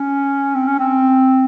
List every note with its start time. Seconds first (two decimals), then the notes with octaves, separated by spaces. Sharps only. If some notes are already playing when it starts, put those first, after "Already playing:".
Already playing: C#4
0.55 C4
0.67 C#4
0.80 C4